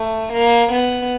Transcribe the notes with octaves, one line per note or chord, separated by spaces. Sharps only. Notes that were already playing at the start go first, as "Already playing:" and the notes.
Already playing: A3
A#3
B3